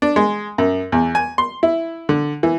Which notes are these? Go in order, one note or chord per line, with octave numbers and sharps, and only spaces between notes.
D4
G#3
F#2
E2
G#5
C6
E4
D3
E3